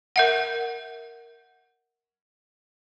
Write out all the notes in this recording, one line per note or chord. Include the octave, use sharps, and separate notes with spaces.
A#4 E5 F#5